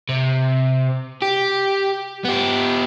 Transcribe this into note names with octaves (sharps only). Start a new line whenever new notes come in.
C3
G4
B3 G4